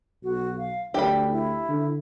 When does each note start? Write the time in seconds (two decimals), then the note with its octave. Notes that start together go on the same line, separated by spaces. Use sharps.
0.23 B1 F#4
0.58 F5
0.94 D2 D4 G4 B5
1.31 E4
1.68 D3